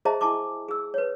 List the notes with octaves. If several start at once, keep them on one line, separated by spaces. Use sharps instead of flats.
G#4 C5 D#5 E5 A5 A#5
E4 G#5 A5 C#6 D6
G#4 E6
B4 C#5